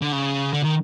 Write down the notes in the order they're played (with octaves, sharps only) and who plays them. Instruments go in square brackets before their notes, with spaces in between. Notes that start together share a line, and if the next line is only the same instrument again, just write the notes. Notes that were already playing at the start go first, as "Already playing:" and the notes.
[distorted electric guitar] D3
C#3
D3
D#3